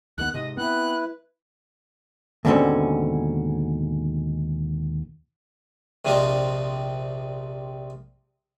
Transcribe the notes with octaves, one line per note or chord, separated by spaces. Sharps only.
D#2 D#3 B3 F#6
G#2 C3 D#5
B3 C4 E4 B4 F#6
D#2 G#2 B2 D3 C4 C#4
A#1 C3 C4 D4 F4 D#5